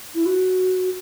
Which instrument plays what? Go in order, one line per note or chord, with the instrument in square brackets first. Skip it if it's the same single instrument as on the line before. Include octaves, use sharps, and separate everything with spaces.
[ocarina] E4
F#4